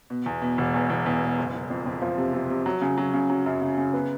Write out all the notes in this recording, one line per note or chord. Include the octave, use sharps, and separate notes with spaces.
B2
E2
B2
E1
E2
E2
E2
B2
F#1
F#1
F2
F2
F3
C3
C3
C3
F#3
C#3
F#3
C#3
F#3
F#2
C#3
C#3
B3